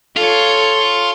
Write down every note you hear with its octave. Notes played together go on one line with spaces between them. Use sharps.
F4 A4 C#5